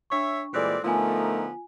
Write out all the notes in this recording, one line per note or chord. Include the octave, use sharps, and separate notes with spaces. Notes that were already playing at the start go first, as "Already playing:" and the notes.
D4 C#5 E5 C#6
A#2 E3 G3 G#3 C4 A4 D5 F#6
D3 F3 A3 B3 D#4 F4 A#4 G#5